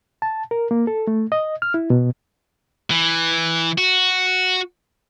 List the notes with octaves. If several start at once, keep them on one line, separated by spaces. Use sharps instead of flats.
A5
A#4
A#3
A4
A3
D#5
F6
E4
B2
E3
F#4